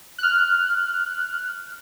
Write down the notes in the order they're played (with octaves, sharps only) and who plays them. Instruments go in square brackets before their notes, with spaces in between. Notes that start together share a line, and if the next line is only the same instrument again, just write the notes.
[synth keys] F6 F#6